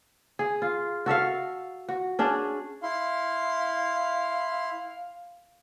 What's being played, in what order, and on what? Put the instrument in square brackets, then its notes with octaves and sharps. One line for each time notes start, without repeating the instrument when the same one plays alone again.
[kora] G#4
F4
F#4 A4 E5 F5
F#4
C#4 D4 G#4
[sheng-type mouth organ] E4 C6 [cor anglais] F5